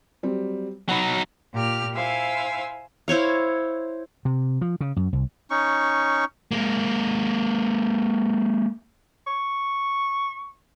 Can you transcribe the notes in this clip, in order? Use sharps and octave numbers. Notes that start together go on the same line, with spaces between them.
F#3 G3 C4
F#3 D#4 F#5 B5
A#2 G4 F6
E4 C5 F5 G#5 E6
E4 C5 C#5 F5
C3
F3
C#3
F#2
C2
C#4 D#4 C#6
G#3 A#3
C#6